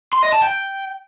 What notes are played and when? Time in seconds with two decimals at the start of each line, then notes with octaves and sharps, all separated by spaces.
0.13 C6
0.23 D#5
0.32 A5
0.42 G5